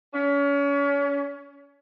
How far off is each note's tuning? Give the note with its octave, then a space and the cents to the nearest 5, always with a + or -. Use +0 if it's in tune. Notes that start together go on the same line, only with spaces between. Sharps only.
C#4 +35